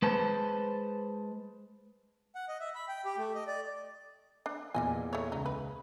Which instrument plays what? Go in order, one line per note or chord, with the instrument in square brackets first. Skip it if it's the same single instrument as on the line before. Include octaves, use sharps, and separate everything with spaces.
[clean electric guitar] G#3 B4 C5 A5
[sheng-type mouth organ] F#5
D#5
E5
B5
G5
G4
A3
D#5
D5
[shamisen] D4
[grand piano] E2 A#2 [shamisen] G3 D#5 G#5
[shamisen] A3 C#5
[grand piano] C#2 [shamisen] D#4
[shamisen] B4